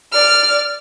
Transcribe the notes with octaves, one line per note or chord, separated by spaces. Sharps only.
D5 F6